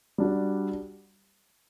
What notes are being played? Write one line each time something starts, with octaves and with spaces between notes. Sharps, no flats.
G3 D4 F#4